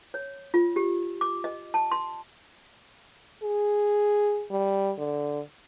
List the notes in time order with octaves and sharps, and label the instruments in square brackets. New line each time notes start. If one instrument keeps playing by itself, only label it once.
[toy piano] C#5
F4
G4
D6
D#5
A5
C6
[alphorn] G#4
G3
D3